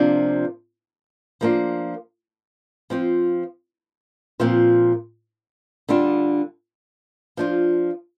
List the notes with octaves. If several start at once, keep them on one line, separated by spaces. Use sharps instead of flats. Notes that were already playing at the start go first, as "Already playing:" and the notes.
Already playing: C3 F3 A#3 D4 F4
F3 A#3 D4 F4
F3 C4 F4
A#2 F3 C4 F4
D3 G3 D4 F4
F3 D4 F4